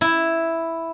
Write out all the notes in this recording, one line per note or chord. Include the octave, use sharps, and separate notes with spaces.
E4